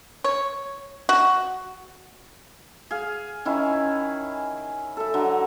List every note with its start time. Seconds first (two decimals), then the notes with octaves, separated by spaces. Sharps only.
0.24 C#5
1.09 F#4
2.91 G#4 F5
3.45 D#3 C#4 E4
4.97 A4 E5
5.14 D3 F#3